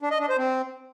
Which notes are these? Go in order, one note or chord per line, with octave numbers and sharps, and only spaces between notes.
D4
D#5
D4
C5
C4